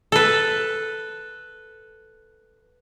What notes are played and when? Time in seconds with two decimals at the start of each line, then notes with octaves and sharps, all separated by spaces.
0.12 A4 B4